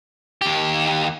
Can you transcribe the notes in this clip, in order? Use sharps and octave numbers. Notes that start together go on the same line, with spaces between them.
D#2 G4